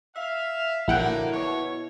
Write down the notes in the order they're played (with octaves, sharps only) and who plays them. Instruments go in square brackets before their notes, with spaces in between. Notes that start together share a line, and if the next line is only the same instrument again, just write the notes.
[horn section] E5 F5
[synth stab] A#1 F#5 G5 [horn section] D3 F#3 A#3 [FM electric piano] E4
[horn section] B2 C#5